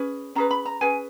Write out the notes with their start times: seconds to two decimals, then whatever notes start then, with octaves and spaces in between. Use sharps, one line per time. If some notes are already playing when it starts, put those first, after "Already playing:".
Already playing: C#4 G#4 B4
0.35 C#4 G#4 B4 A#5
0.51 B5
0.66 A#5
0.81 C#4 G#4 B4 G#5